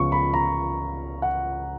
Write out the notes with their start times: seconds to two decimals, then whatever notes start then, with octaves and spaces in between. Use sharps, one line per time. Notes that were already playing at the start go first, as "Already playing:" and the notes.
Already playing: C#2 C#3 F3 B3 C#6
0.12 B5
0.34 A#5
1.22 F#5